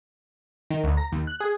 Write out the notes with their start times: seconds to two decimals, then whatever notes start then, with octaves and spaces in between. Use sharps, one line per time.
0.70 D#3
0.84 D2
0.97 A#5
1.12 D#2
1.27 F#6
1.40 G#4